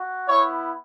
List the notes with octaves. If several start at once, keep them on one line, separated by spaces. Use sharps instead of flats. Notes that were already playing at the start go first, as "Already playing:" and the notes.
Already playing: F#4
B3 E4 C#5